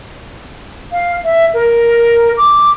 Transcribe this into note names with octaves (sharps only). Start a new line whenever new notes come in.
F5
E5
A#4
D6